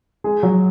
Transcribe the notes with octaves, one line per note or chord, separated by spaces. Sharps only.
G#3 G#4
F#3 F#4